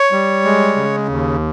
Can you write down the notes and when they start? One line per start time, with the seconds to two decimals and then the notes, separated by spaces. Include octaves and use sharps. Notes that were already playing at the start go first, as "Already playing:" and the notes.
Already playing: C#5
0.12 G3
0.45 G#3
0.76 C#3
1.09 D#2